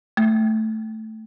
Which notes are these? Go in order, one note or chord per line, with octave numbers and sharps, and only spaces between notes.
A3